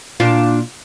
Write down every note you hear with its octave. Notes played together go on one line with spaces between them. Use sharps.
A#2 D4 F4